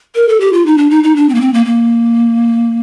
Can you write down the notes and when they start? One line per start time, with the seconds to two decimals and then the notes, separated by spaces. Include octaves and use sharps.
0.15 A#4
0.28 A4
0.40 G4
0.53 F4
0.66 D#4
0.78 D4
0.91 D#4
1.04 D#4
1.16 D4
1.29 C4
1.35 A#3
1.41 C4
1.54 A#3
1.66 A#3